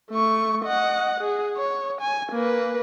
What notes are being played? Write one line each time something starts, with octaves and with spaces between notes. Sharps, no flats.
A3 C#6
D#5 F#5
G#4
C#5
G#5
A#3 B4